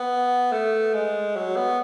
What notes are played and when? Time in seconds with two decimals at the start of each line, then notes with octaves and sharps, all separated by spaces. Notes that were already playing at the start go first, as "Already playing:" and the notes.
Already playing: B3
0.52 A3
0.94 G#3
1.36 F#3
1.56 B3